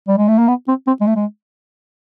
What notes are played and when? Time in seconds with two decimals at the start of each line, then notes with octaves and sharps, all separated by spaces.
0.08 G3
0.18 G#3
0.28 A3
0.38 A#3
0.48 B3
0.68 C4
0.87 C4
1.01 G#3
1.07 A3
1.16 G#3